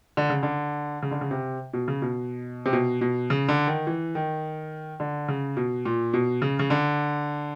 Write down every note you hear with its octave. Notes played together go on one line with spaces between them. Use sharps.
D3
C#3
D3
C#3
D3
C#3
C3
B2
C#3
B2
C3
B2
B2
C#3
D3
D#3
E3
D#3
D3
C#3
B2
A#2
B2
C#3
C#3
D3